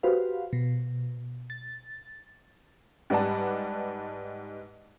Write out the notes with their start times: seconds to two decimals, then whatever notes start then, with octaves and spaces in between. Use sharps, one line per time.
0.03 F#4 G4 B4 C5 F5
0.53 B2
1.50 A6
3.10 G#2 G3 B4 D5 F#5 A5